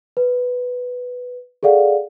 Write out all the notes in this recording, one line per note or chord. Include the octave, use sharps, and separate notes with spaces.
B4
G#4 A4 D5 F5 F#5